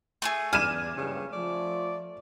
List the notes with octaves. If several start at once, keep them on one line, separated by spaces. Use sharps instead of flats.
A3 E4 G#4
E2 D5 G#5 F6 D#7 E7
F#1 C#2 G2 C#3
F3 A3 D5